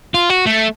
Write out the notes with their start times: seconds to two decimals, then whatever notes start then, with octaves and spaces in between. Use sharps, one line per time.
0.14 F4
0.30 F#4
0.46 A3